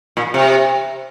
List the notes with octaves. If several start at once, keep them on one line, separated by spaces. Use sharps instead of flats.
A#2
C3